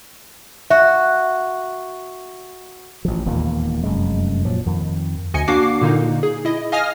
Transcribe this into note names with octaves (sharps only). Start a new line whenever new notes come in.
F#4 E5
A1 F3
E1 D#2 A#2 A#3
F1 F#2 G#3
A#2 F3 F#3
F2 D#3
D2 D#5 G#5 C#7
A#3 D4 F#4 D6 C7
A#2 D3 A#3 D#4
G#4
E4 D#5
D#5 F5 G#5 D#6 F6 A#6